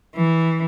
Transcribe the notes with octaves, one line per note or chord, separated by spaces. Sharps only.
E3